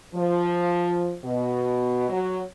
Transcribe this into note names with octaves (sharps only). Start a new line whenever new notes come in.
F3
B2
F#3